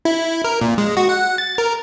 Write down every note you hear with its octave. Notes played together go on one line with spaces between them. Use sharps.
E4
A#4
A#2
G#3
F#4
F#5
A6
A#4